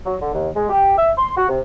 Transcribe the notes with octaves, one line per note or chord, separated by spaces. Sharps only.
F#3
D3
D#2
G#3
G4
E5
C6
F#4
C3